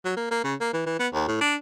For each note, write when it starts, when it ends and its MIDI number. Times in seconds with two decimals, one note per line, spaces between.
0.05 0.15 54
0.17 0.31 58
0.31 0.43 58
0.44 0.55 49
0.60 0.72 58
0.74 0.85 52
0.86 0.96 52
0.99 1.08 59
1.13 1.24 39
1.28 1.37 45
1.41 1.56 62